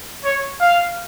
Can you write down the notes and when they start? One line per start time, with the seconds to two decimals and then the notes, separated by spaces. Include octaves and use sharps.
0.25 C#5
0.61 F5